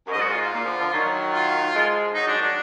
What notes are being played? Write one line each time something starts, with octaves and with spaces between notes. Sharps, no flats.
F#2
G#2 D#5
F#4
F4
F4
A#2
D3 F3
D3 F3
D#3 F#3
F4
F3 G#3
D#3 F#3 D#4
G#3 D4
D#3 F#3
D4